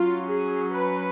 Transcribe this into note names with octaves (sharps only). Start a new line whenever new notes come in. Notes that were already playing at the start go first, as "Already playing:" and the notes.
Already playing: F#3 C#4 F4
G#4
B4